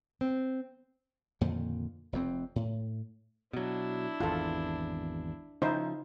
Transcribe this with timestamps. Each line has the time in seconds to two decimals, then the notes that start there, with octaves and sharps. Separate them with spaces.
0.21 C4
1.41 F2 A#2 D3 D#3
2.12 F1 F2 C4
2.56 A2
3.53 B2 F#3 D4 E4
4.20 G#1 E2 F4 A4
5.62 C#3 F3 D#4 E4 C5